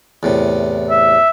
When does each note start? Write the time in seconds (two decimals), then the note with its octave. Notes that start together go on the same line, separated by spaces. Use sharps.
0.23 E2 A2 C3
0.90 E5